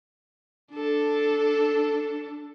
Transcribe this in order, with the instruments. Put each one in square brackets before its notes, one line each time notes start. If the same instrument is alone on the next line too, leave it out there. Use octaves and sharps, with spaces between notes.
[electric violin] D4 A4